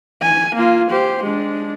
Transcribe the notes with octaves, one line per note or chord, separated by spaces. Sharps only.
G#5
A#3 F4
G4 C5
G#3 D4